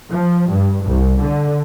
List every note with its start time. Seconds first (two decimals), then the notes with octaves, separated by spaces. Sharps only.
0.11 F3
0.50 G2
0.85 C2
1.23 D3